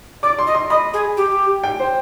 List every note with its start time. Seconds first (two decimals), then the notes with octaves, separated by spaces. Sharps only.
0.23 D5 D6
0.39 C6
0.47 D#5
0.55 C6
0.70 D#5 B5
0.93 G#4
1.17 G4
1.64 G5
1.80 C5